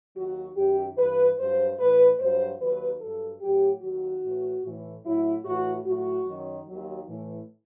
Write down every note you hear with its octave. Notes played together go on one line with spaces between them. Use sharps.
D#2 D#3 F#3 F#4
F#2 D#3 F#3 G4
G2 E3 B4
G2 F#3 C5
A2 E3 B4
G2 F#3 C5
D#2 D#3 F#3 B4
G2 F#3 A4
A2 F#3 G4
D#2 D#3 F#3 F#4
A2 E3
A2 E3
A2 F#3 E4
A2 E3 F#4
A2 F#3 F#4
F#2 D#3 F#3
D#2 D#3 F#3
A2 E3